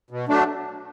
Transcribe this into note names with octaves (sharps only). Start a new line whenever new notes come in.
B2
F#3 A3 D4